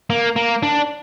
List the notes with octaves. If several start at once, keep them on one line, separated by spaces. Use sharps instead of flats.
A#3
A#3
D4